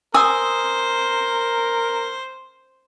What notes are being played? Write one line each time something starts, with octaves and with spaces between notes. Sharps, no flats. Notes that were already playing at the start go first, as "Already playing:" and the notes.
A#4 C5 G#5 D#6 E6